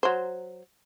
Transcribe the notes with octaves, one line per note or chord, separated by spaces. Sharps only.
F#3 C5